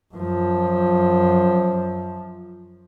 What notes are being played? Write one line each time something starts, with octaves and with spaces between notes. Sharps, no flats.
F#2 F3